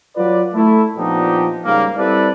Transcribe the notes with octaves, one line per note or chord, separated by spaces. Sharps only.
F#3 F4 B4 D5
A3 E4
A#2 F3 B3 D4 D#4 G4
G#2 C#3 G3 A#3
G3 C4 E4 A4 B4 D5